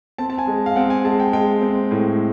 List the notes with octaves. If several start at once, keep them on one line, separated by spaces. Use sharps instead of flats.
C4 A5
A5
G#5
G#3
F5
C4 F#5
G#5
G#3 A5
G5
G#3 G5
C4
A2